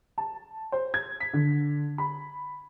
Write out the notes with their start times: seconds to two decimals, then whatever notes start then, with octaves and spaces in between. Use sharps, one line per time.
0.18 A5
0.72 C5
0.94 G#6
1.20 B6
1.33 D3
1.98 B5